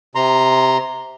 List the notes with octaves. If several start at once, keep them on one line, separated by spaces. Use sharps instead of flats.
C3 A#5 C6